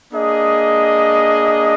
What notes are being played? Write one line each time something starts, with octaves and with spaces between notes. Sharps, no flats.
A#3 D4 G#4 D#5